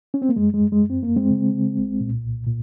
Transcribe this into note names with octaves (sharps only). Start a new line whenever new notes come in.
C#4
C4
A#3
F#2 G#3
G#3
F#2
G#3
F#2
C4
F#2 A#3
G#3 C4
C#3
C#3
C2
A#2
C2
A#2